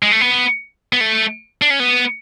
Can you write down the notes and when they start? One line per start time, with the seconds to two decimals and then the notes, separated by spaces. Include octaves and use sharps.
0.03 G#3
0.12 A3
0.21 B3
0.93 B3
1.01 A3
1.62 D4
1.70 C#4
1.80 B3